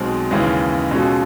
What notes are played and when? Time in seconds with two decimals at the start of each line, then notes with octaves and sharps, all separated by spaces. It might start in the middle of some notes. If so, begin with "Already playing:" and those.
Already playing: B1 B2 G#3 C4
0.31 D#2 C#3 E3 G#3 C#4
0.91 B2 G#3 C#4 F4 A4